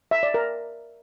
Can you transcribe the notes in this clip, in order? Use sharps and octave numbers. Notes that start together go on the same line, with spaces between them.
E5
D5
A#4